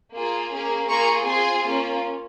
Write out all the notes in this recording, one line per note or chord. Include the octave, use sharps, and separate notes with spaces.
A#3 F4 G#4
A#3 C#4 G#4
A#3 F4 G#4 A#5 C#6
C4 F4 G#4 G#5 C6
A#3 C#4 F4